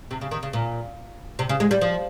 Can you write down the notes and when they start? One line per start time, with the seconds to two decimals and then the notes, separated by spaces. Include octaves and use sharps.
0.11 C3
0.21 C#3
0.31 D#3
0.43 C#3
0.53 A#2
1.39 C3
1.49 C#3
1.60 G#3
1.71 G3
1.81 F3